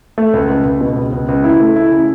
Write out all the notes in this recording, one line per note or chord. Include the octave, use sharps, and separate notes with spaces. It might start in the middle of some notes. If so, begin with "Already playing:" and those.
A3
C#2
C#2
C#2
B2
C#2
C#2
C#2
E4
A3
E4
C#3